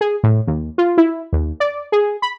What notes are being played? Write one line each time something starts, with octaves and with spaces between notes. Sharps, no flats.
G#4
A2
D#2
F4
E4
D#2
D5
G#4
B5